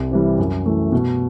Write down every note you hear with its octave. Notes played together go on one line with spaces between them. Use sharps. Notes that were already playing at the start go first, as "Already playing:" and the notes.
Already playing: C2
C3 E3 G3
F#2
E3 A3
B2